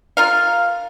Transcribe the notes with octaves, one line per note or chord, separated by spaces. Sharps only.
F4 A#4 F5